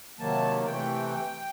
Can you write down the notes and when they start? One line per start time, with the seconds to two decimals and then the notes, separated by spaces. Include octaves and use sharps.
0.19 C3 D#3 F#3 A#3 A5
0.66 C3 E3 A3 G5